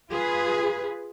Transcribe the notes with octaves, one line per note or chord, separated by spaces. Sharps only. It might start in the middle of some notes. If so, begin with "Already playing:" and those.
F4 G#4 B4